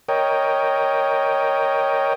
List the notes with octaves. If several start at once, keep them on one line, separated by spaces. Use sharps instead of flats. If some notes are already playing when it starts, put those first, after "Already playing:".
A#4 C#5 D#5 G5